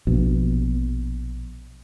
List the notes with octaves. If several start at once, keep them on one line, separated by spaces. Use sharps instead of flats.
A#1 B2